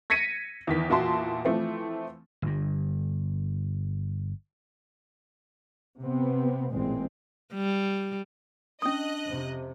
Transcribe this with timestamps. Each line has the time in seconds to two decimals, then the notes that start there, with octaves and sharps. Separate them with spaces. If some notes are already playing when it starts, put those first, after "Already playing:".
0.10 G#6 A#6 B6 C#7 D#7
0.67 E2 D#3 B6
0.89 E2 A#2 F#4 E5 A5 C6
1.45 E3 F3 A3 C4
2.42 G1 G2
6.02 C3 B3 C4
6.71 A1 A#2 G#3 C4
7.54 G3
8.82 C#4 D4 D#5 D#6 F#6
9.25 F2 C3